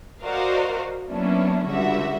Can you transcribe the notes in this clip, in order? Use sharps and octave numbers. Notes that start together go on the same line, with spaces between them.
F#4 A#4 C5 D5 D#5 F5
F#3 A#3 B3 C#4 D4 E4
C#2 D3 G3 F#4 E5